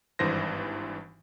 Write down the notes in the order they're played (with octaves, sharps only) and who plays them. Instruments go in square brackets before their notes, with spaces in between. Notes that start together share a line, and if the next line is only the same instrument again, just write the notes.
[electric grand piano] G#1 G2 E3 C5 A#6